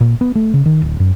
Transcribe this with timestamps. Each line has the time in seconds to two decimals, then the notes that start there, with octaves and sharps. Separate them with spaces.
0.01 A#2
0.21 B3
0.35 A3
0.54 C#3
0.66 D#3
0.82 D1
1.00 F#2